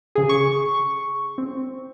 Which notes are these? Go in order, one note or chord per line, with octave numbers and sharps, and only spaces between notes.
C#3 G#4
C#6
C4